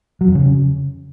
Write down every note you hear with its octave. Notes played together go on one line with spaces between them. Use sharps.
F#3
F2
C#3